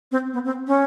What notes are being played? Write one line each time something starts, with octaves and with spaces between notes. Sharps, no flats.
C4
B3
C4
C#4